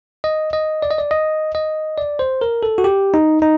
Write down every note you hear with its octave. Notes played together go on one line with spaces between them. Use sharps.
D#5
D#5
D5
D#5
D5
D#5
D#5
D5
C5
A#4
A4
F#4
G4
D#4
D#4